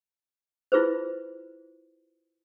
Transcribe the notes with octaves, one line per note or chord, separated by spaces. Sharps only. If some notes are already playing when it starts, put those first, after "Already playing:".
E4 F4 G#4 B4 C5